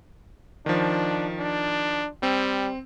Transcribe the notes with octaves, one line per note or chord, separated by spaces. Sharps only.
D#3 F3 D4
D4
G3 C4